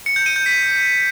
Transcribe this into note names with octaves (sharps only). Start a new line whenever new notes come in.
C#7
G6
D#7
G6
B6